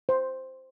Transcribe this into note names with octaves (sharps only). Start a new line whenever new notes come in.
C5